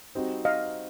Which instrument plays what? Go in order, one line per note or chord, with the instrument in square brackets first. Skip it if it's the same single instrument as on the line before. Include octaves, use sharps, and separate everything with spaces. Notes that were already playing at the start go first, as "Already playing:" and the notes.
[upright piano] G3 C4 D#4 F#4
[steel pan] D#5 F5